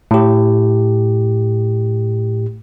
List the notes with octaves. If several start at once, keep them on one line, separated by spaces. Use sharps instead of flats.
A2 G4